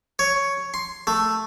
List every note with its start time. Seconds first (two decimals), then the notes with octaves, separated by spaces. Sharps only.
0.19 C#5
0.74 C6
1.07 A3